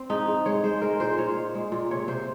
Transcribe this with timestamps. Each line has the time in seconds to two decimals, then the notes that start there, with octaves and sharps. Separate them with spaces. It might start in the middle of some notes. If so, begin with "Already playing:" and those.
Already playing: C4
0.10 G#2 D#4
0.28 G#2
0.46 G#3 C#5
0.64 G#3 C5
0.81 G#3 A#4
1.00 A#2 C5
1.18 A#2 C#5
1.37 G#3
1.55 G#3
1.72 A#2
1.91 C3 C#5
2.08 C3 C5